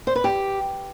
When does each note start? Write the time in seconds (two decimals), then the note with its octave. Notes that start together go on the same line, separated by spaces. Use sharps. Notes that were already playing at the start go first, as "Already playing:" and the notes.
0.07 C5
0.16 B4
0.24 G4